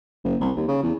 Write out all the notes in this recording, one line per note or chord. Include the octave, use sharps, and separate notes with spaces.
F#1
C2
D#2
C#3
E2